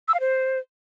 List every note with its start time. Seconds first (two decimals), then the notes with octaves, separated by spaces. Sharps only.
0.08 E6
0.14 F5
0.20 C5